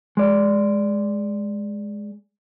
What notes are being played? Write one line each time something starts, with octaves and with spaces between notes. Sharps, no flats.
G#3 D5